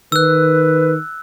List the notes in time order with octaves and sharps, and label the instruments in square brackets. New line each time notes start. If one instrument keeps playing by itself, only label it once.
[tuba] D#3 [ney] B4 [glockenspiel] E6 F#6